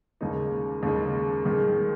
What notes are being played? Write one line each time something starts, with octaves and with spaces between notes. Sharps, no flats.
D#2 C#3 G#3 D#4
D#2 C#3 G#3 D#4
G#2 D#3 G#3